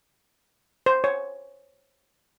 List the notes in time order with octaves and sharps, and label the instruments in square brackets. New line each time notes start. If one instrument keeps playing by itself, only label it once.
[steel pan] C5
C#5